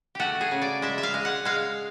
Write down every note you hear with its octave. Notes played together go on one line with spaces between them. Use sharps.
A3 F#4 G4
G#4
C#3
D5
G#3 E5
E5
F5
G#3
F#5
G#3 F5